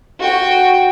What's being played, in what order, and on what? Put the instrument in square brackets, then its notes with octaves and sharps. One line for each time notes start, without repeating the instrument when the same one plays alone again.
[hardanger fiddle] F#4 G5